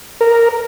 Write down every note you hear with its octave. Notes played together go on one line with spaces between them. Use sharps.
A#4